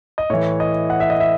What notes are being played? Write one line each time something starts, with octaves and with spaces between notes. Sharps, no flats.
D#5
A2 E3 C#5
D#5
F#5
E5
D#5
E5